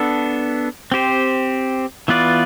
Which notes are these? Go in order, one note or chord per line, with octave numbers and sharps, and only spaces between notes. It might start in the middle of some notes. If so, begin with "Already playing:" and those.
Already playing: B3 D4 A4
C4 G4 C5
E3 B3 F4 B4 D5